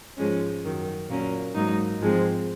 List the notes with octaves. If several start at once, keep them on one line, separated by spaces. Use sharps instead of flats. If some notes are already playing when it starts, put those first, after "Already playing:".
G#2 F3 G#3 C#4
F#2 D#3 F#3
A#2 F#3 A#3 C#4
G#2 F#3 A#3 D#4
G#2 F3 G#3 C4